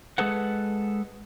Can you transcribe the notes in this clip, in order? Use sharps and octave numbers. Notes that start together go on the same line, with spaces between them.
G#3 G#4 A4 B4 F#5